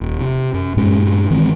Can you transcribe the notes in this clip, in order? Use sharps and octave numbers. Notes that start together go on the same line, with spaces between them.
D#1
C3
F#2
G2 A#2 G#3 C#4
D#3 E3 G#3 C4